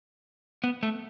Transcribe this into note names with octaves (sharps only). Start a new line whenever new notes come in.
B3
A3